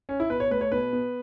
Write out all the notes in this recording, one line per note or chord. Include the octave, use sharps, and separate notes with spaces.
C#4
E4
B2 B4
C#5
A3 B4
C#5
B2 B4
B3